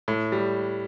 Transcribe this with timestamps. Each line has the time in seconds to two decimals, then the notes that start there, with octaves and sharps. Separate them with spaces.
0.08 A2
0.32 G3